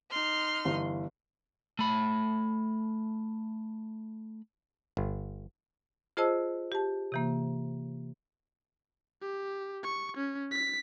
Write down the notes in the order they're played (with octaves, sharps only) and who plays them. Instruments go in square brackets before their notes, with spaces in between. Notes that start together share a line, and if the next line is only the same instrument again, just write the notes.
[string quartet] D#4 C6 F6
[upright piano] G1 E3
[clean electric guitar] A3 B5
[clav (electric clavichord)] G1
[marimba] F4 G#4 C5 D#5 A5 E6
G4 A5
C3 E3 A#3
[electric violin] G4
C#6
C#4
B6